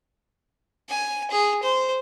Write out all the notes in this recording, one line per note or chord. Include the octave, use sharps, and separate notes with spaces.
G#5
G#4
C5